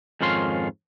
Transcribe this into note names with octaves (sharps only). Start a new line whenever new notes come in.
F2 G#2 D#3 C#4 F4 C6